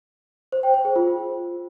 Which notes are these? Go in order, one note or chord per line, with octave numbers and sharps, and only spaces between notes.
C5
G5
C5
G#4
F4